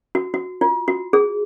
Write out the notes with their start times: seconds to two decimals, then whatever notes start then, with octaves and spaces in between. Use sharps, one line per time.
0.15 F#4
0.34 F#4
0.61 F4
0.88 F#4
1.13 G#4